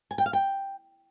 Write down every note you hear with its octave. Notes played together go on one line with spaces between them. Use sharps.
G#5
G5
F5
G5